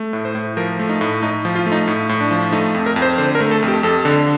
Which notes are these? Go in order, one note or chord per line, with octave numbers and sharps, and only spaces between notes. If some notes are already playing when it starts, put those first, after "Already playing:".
Already playing: A3
A2
C5
A2
F3 A#4
A3
D#4
A2
A2 D#4
F3
F4
A3
D#4
A2
A2
D4
F3
A3 D#4
F2
A#4
F2
C5
D3 C5
A#4
A3
A4
F2
G4
F2 A4
D3